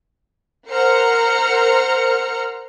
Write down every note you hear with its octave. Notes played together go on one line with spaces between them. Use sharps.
A#4 C5 F#5 A#5 F6 C#7